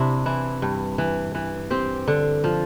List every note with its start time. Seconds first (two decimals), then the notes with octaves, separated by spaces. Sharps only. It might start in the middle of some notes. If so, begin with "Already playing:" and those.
Already playing: C3 D4 E4
0.26 E3 E4
0.62 G2
0.98 E3
1.35 E3
1.70 C4 G4
2.08 D3
2.44 F3